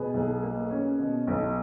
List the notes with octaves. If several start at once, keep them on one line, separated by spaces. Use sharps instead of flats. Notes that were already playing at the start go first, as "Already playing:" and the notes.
Already playing: B2 G#4 B4
B1
A#3
C#4
B2
B1